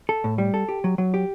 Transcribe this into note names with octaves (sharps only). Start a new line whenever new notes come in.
A4
A2
G3
A4
G4
F#3
F#3
G4